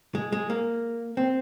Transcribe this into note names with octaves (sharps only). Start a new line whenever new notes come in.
G#3
G#3
A#3
C4